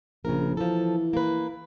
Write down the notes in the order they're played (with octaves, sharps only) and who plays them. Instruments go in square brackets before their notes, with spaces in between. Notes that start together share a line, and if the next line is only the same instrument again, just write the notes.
[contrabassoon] A#1 [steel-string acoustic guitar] C#3 A#4
[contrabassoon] E3 [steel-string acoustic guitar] F3 A4
[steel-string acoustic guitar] A#3 B4